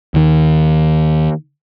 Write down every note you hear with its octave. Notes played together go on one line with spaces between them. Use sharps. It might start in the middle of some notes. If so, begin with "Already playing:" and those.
D#2 D#3